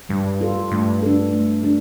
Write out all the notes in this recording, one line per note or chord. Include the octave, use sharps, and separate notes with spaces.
G2 G3
F4 A4
G2 A3
D4 A4
A3
D4